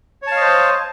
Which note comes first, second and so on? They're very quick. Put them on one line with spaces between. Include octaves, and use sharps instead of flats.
C#5 A5 F5 D#5 C5